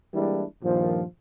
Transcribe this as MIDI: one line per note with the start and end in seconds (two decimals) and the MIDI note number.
0.14 0.44 52
0.14 0.44 55
0.14 0.44 56
0.14 0.44 58
0.14 0.44 62
0.14 0.44 64
0.63 1.03 43
0.63 1.03 46
0.63 1.03 51
0.63 1.03 53